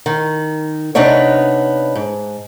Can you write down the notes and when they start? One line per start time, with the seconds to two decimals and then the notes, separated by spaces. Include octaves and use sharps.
0.06 D#3
0.95 C3 B3 D4 D#4 C#5
1.95 G#2